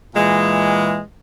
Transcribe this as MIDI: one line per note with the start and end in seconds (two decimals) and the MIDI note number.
0.14 1.00 46
0.14 1.00 52
0.14 1.00 56